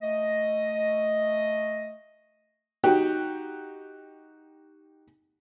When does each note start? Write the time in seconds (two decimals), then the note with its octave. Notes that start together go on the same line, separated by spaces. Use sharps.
0.02 A3 D#5
2.84 D#4 F#4 G4